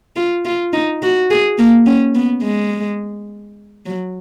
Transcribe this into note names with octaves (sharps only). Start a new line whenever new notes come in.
F4
F4
D#4
F#4
G#4
A#3
C#4
B3
G#3
F#3